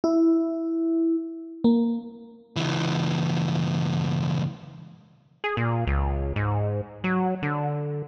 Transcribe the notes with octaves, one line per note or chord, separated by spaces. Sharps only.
E4
A#3
C#2 E3
G#4
A#2
C#2
G#2
F#3
D3